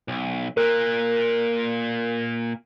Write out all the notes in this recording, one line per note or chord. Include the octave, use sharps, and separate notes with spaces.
B1
A#2 A#3 A#4 F#6